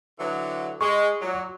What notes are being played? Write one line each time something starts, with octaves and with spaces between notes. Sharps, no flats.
D3 E3 F#3
G#3 C#6
A#2 F#3